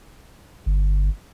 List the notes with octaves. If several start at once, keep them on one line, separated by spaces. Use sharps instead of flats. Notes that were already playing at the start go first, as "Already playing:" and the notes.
G1